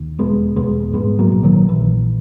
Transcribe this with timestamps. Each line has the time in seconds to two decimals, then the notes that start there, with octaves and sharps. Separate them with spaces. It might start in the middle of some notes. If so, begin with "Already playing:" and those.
Already playing: D#2
0.18 E1 G#3 B3
0.56 E1 G#3 B3
0.93 G#2 G#3 B3
1.19 F#3 A#3
1.32 A#1
1.43 D#3 F#3
1.69 A#1 E3